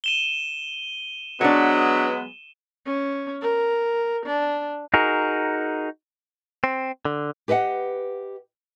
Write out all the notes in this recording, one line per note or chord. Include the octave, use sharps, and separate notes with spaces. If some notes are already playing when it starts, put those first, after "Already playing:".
D#7 E7 G7
F#3 G#3 B3 D4 C#5
C#4
A#4
D4
D#4 F#4 G#4 A#4
C4
D3
G4 B4 D#5 E5 F#5